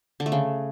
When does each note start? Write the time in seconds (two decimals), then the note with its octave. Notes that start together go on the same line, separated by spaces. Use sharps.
0.20 D3
0.26 A3
0.32 C#3